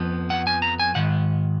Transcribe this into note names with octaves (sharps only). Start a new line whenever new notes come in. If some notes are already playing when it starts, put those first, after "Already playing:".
Already playing: F2 F3 B3
F#5
G#5
A#5
G#5
G#2 D#3 F#5